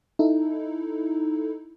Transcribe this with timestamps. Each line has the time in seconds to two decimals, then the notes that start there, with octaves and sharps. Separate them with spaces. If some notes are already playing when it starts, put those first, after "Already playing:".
0.19 D#4 E4 A4